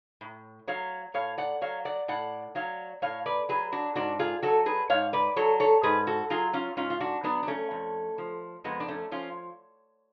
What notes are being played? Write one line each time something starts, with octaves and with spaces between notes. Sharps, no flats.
A2
F#3 C#5 F5
A2 C#5 F5
D5 F#5
F#3 C#5 F5
D5 F#5
A2 D5 F#5
F#3 C#5 F5
A2 C#5 F5
B4 D5
F#3 G#4 B4
D4 F#4
G#2 D4 F#4
F4 G#4
F#3 F#4 A4
G#4 B4
G#2 C#5 F5
B4 D5
F#3 A4 C#5
A4 C#5
G#2 G#4 B4
F#4 A4
F#3 F4 G#4
C#4 F4
G#2 C#4 F4
F4
D4 F#4
F#3 B3 D4
D4
A3 C#4
F2
F3
F2 G#3 B3
D4
A3 C#4
F3 C#4 F4